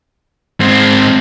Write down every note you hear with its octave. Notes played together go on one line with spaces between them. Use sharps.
G#2 C4